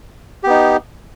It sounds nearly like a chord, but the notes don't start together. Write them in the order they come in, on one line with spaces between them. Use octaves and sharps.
G4 B3 D#4